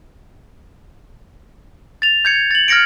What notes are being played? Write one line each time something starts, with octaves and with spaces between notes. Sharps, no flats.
A6 F7
G6 G#6 C#7
A6 F#7
F6 G#6 A#6 C#7 D7